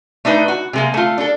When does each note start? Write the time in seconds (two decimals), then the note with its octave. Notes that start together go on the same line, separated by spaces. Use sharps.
0.25 A3 D4 D#4 B4
0.48 F#4
0.73 C3 G#3 A#3
0.94 A3 F4
1.18 D4 A4